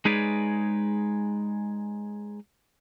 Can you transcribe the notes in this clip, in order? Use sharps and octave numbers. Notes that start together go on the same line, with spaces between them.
G#3 D#4 G#4 B4 C#5 D5